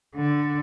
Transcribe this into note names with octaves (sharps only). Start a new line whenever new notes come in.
D3